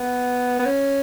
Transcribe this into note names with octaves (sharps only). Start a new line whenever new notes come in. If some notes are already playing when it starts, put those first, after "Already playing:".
Already playing: B3
B3
C#4